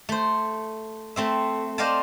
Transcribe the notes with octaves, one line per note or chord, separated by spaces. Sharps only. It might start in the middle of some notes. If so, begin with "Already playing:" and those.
A3 C5
A3 C4 E5
C5 D5 D#5 F5 G5 A5